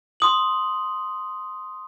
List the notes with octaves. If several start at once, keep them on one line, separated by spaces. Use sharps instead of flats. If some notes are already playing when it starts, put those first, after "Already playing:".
C6 D#6 F#7